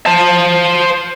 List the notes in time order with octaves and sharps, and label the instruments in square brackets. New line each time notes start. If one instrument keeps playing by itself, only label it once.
[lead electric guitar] C5 A5